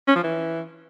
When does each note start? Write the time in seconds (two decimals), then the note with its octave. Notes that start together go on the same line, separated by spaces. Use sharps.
0.08 C#4
0.16 F3
0.24 E3